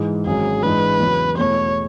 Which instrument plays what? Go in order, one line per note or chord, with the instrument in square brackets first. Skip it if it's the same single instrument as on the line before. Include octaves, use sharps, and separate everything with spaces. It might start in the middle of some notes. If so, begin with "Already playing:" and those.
Already playing: [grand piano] G#2 E3 G#3
[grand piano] G#1 G#2 F#3 C#4 [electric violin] G#4
[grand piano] G#2 E3 G#3 D4 [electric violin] B4
[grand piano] E2 C#3 F#3
[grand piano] E2 B2 A3 [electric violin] C#5